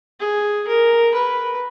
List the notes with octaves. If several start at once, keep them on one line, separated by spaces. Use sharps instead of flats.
G#4
A#4
B4